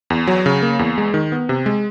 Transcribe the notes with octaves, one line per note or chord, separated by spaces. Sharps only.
E2
F#3
C#3
A#3
E2
G#3
D#3
B3
C3
G#3